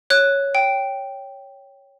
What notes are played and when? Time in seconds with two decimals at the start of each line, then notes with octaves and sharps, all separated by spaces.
0.10 C#5 F#6
0.55 G5